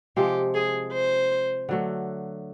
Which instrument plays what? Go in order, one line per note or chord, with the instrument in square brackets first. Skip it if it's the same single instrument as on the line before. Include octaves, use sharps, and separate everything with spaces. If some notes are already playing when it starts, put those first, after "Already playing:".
[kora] C3 F3 G#3 [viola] G4
[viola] G#4
C5
[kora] D3 F#3 A3